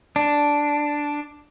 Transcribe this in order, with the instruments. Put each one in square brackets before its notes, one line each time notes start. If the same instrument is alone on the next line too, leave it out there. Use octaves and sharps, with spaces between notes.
[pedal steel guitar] D4